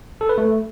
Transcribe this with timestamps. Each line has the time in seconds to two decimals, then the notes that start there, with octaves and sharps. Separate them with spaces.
0.21 A4
0.29 B4
0.38 A3